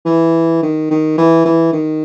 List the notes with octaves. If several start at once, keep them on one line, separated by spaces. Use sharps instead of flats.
E3
D#3
D#3
E3
E3
D#3